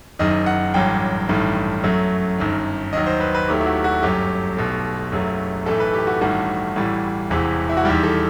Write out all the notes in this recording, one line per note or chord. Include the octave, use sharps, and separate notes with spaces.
F#1 F#2 D#3 D#5
F#5
A1 G2 F#3 G5
A1 G2 D#3 A3
F#2 F#3 A3
G1 F#2 D#3
D#2 D#3 F#3 D#5
C5
B4
B4
D#2 D#3 F#3 A3 G4
E4
F#4
F#4
G1 F#2 F#3 A3 G4
B1 B2 A3
F#1 F#2 F#3 A3
B1 A2 E3 A3 A4
B4
G4
F#4
A1 G2 D#3 A3 F#4
A1 A2 E3 G3
E1 E2 C3 E3
E4
F#4
E2 D#3 G3 G4
A4